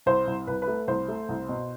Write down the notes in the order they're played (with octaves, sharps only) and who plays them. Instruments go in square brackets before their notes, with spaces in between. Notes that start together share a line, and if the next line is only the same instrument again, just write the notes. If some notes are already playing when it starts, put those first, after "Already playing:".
[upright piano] C2 C5
C2
C2 B4
B4
A3
C2 C5
A3
C2
B2